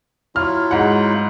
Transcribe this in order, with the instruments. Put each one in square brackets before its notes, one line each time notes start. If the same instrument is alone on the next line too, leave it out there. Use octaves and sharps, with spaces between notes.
[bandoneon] F#3 E4 F4 [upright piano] F6
[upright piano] G#2 F#5